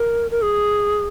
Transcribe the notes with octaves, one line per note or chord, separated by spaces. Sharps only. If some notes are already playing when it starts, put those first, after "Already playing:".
Already playing: A#4
A#4
G#4